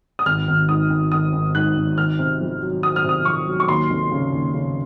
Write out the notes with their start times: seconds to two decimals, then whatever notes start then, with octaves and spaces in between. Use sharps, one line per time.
0.19 D#6
0.26 G#1 F6
0.48 G#1
0.69 G#2 D#6
0.90 G#1
1.12 G#1 D#6
1.33 G#1
1.55 G#2 F#6
1.76 G#1
1.98 D#3 F6
2.19 C3
2.41 F2
2.62 F#3
2.83 F#3 D#6
2.96 F6
3.04 C3 D#6
3.25 F2 C#6
3.47 F#3
3.60 C#6
3.68 D#2 C6
3.90 F1
4.12 C#3
4.33 D#2
4.54 C#3